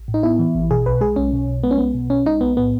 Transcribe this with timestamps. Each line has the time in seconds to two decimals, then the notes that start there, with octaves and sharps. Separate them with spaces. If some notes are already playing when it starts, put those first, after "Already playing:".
Already playing: A1
0.08 A2
0.14 D#4
0.23 B3 E4
0.39 E3
0.54 A1
0.70 B2 G#4
0.86 B1 B4
1.01 G#3 G#4
1.16 B1 C#4
1.32 B2
1.48 B1
1.63 G#3 B3
1.71 C#4
1.78 B1 B3
1.94 B2
2.10 B1 C#4
2.25 G#3 D#4
2.41 B1 B3
2.57 A2 B3